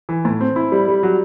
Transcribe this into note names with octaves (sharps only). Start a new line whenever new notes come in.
E3
A2
C4
E4
G3
G3
F#3